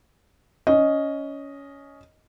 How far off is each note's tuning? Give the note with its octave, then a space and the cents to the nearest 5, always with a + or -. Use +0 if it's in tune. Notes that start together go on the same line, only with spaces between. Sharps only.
C#4 +15 D#5 +0